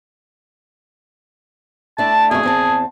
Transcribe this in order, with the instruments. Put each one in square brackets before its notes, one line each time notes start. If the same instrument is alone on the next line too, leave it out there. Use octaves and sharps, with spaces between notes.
[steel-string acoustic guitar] A3 D4 E4 [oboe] A5
[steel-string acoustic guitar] F2 B2 A3 [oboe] G#4
[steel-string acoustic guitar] E2 C4 A5